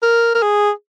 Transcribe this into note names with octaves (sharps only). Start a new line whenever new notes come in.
A#4
A#4
G#4